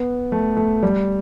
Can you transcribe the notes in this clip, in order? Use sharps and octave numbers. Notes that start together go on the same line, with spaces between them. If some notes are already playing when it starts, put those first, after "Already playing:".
Already playing: B3
A3
A3
G3